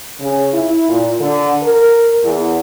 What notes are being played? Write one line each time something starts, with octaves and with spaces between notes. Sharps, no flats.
C#3
E4
A#2
D3
A#4
E2